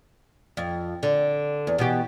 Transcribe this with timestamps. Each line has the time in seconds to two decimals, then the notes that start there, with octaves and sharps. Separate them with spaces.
0.57 F2
1.03 D3
1.67 E2
1.78 B2 E3 G4